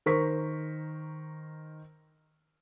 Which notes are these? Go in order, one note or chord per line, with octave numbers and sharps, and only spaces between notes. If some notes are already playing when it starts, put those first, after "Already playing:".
D#3 A#4 C5 C#6 B6